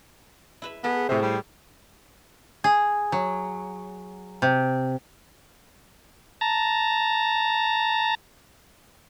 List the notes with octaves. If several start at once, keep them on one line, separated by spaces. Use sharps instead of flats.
E4 B4 E5
B3 G#4 A4
A2 C3 C5
G3
G#4
F#3
C3
A5 A#5